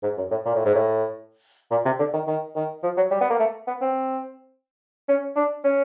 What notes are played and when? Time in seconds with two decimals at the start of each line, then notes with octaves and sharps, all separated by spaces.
0.03 G#2
0.17 F#2
0.31 A2
0.45 A#2
0.55 A2
0.65 G#2
0.75 A2
1.71 A#2
1.85 C3
1.99 D3
2.13 D#3
2.27 D#3
2.55 D#3
2.83 F3
2.97 F#3
3.11 G3
3.21 B3
3.30 A#3
3.39 A3
3.67 B3
3.81 C4
5.08 C#4
5.36 D4
5.64 C#4